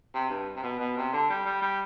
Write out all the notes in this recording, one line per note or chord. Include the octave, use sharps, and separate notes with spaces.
C3
G2
C3
B2
B2
C3
D3
G3
G3
G3